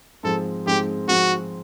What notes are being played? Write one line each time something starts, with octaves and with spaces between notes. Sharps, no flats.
G#2 F3 G#3 C4 A4
G#2 F3 G#3 C4 G4
G#2 F3 G#3 C4 F#4